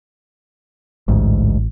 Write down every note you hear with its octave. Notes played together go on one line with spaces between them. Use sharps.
A1 D2 G#2